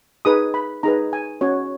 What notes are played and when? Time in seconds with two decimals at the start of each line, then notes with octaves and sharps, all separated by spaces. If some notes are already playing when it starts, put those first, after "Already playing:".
0.25 D#4 G#4 B4 D#6
0.54 B5
0.83 D#4 G#4 B4 A#5
1.13 G#5
1.41 C#4 F#4 C#5